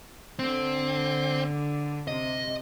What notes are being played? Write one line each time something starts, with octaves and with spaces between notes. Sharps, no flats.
D3 C4
C3 D#5